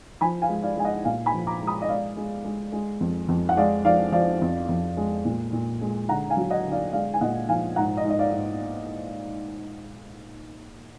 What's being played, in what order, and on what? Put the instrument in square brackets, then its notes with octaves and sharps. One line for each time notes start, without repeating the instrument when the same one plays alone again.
[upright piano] F3 G#5 B5
F5 G#5
G#3
D5 F5
G#3 G#5
D#5 F#5
A#2 F5 G#5
G#5 B5
F3
A#5 D6
G#3
B5 D#6
D#5
G#3 D5 F5
G#3
G#3
G#3
F2
F2
F#5
G#3 D5 F5
F3 D5 F5
F3 D5 F5
F2
F2
G#3
A#2
A#2
G#3
D3 F#5 A#5
F5 G#5
F#3
D#5 F#5
D3
D5 F5
G#3 D5 F5
G#5
A#2 D#5 F#5
F3 F5 G#5
G#2 F#5 A#5
D#5
G#2
D#5
D5 F5
G#2